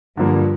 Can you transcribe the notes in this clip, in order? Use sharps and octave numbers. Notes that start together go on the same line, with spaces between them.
G2 D3 F3 A#3